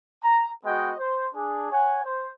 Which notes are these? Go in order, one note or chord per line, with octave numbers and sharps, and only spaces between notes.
A#5
G#3 B3 F#4 D#5 G5
C5
D4 G#4
C#5 F#5 G#5
C5